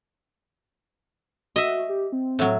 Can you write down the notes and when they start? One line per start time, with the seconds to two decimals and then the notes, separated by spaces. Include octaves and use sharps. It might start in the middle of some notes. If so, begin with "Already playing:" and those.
1.56 F#4 D#5 E5
1.89 G4
2.12 C4
2.39 A2 F#3